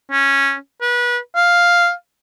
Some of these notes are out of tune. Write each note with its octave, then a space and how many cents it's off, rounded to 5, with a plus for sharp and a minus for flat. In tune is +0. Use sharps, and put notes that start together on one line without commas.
C#4 -10
B4 -30
F5 +0